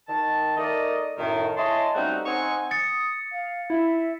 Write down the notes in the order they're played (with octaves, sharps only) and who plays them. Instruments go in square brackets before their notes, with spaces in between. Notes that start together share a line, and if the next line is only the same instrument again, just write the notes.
[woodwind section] D#3 A5
A3 D#4 A#4 D5 D#5
F#2 A2 D#3
E4 G#4 C#5 D#5 A5 C6
G3 A3 C4 C#4 D#4 F#4
C4 D#4 C5 F#5 G#5 C#6
[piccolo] D#6 [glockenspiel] A6 C#7
[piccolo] F5
[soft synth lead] E4 [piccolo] E5